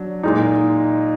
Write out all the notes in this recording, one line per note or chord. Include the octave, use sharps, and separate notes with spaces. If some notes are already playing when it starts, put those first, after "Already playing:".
Already playing: F#3 D4
A#2 G#3 D#4